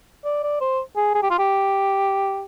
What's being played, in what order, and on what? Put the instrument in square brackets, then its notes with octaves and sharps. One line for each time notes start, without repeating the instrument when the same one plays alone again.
[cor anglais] D5
D5
C5
G#4
G#4
G4
F4
G4